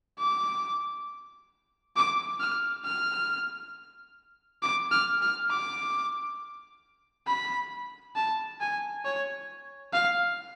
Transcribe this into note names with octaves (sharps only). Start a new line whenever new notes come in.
D6
D6
F6
F6
D6
F6
F6
D6
B5
A5
G#5
C#5
F5